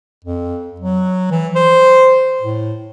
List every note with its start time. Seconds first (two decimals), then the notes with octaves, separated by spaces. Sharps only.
0.25 F2
0.80 F#3
1.31 E3
1.56 C5
2.42 A2